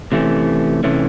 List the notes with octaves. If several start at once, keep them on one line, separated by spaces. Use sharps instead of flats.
C3 E3 A3 C#4
C3 E3 A3 C#4